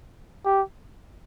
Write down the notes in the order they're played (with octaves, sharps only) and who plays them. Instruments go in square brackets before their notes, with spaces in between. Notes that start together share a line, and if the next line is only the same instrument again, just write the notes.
[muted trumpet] G4